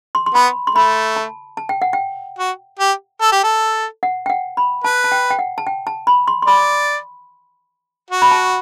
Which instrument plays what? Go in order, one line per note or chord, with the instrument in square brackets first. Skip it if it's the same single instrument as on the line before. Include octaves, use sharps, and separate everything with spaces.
[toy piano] C6
C6
[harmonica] B3 [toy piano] B5
[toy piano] C6
[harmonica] A3 [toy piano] B5
[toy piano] A5
A5
G5
F#5
G5
[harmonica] F#4
G4
A4
G4
A4
[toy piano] F#5
G5
F#5
B5
[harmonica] B4 [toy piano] A5
[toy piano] A5
G5
G5
F#5
A5
G5
A5
B5
C6
C6
[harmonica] D5 [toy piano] B5
[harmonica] F#4
[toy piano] B5
A5